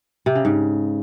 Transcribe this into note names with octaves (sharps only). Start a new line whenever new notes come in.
C3
C#3
G#2